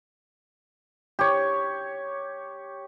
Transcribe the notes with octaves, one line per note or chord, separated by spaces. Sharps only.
G4 C#5